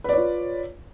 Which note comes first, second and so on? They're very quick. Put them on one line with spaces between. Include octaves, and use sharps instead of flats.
B4 D5 C#5 F4